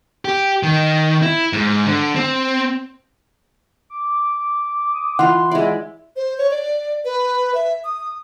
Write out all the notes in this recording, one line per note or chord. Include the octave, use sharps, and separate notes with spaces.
G4
D#3
E4
G#2
D3
C4
D6
D#6
E3 F4 F#5 C6
G#3 E4 D5 E5
C5
C#5
D5
B4
E5
D#6